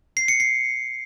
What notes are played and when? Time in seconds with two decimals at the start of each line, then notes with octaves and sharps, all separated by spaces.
0.17 C7
0.28 C#7
0.40 C7